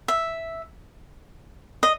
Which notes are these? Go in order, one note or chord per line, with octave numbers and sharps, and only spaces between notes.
E5
D#5